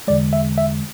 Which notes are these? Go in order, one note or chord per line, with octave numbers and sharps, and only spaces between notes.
E2 D3 G#3 D5
E5
E5